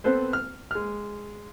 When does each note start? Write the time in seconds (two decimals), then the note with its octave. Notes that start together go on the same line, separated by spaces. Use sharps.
0.04 B3 C4 A4 B4 C5
0.33 F6
0.71 G#3 F6